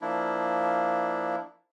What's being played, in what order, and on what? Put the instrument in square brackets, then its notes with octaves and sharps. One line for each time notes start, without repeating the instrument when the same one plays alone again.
[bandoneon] F3 A#3 D4 E4